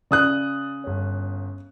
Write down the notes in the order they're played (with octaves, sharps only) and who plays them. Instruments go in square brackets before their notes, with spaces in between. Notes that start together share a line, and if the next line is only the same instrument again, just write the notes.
[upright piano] C#3 D#6 F#6 [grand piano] D5
[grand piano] G1 C#4